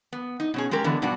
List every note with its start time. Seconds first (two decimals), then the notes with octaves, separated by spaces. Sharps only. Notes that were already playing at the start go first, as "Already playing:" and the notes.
0.13 B3
0.40 D#4
0.54 B2 C#4 G#4
0.71 G#3 C#4 G4 A#4
0.84 D3 E3 G#3 B3
1.02 G2 B2 D4 F#4